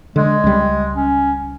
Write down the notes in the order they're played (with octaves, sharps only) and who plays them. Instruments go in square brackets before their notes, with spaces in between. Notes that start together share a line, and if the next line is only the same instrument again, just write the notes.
[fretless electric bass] D3 [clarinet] G#3
[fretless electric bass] C#2 G3
[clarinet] C#4